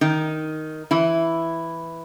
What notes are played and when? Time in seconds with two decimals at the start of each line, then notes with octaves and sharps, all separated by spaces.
0.01 D#3 D#4
0.91 E3 E4